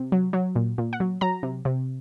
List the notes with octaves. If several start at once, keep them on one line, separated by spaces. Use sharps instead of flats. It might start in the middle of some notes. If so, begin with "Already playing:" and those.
Already playing: C3
F#3
F#3
A#2
A#2
F#5
F#3
F#3 A#5
C3
C3